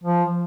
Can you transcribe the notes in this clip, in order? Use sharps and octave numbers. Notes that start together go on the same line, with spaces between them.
F3